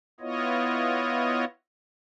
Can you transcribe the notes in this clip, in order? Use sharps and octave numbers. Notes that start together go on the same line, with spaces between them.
B3 E4 F4 C#5 D#5